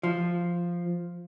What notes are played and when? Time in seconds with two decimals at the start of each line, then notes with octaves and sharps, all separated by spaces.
0.03 F3